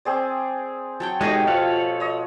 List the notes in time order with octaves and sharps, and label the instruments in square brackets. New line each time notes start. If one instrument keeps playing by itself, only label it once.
[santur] C4 G#4 D5
[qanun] F#3 C#5 G5 [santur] A5
[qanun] B2 A3 G4 [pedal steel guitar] G#3 D#4 G#4 [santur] C#5
[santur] F3 [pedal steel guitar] A4 F5 F#5
[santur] C#5 D#5